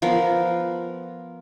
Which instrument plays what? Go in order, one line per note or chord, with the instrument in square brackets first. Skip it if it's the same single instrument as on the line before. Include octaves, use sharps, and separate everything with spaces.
[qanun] F3 B3 A#4